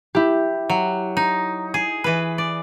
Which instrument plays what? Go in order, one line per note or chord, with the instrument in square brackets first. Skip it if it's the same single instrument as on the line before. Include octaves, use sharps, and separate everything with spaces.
[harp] E4 G4
[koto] F#3
D#4
G#4
E3 B4
D5